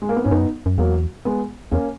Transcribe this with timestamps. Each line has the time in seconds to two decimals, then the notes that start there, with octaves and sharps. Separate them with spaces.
0.02 G#3
0.09 A#3
0.16 B3
0.24 G#2 C#4
0.31 F#2 B3 D#4
0.66 F#2
0.78 E2 F#3 A#3
1.25 G#3 B3
1.71 E2 A#3 C#4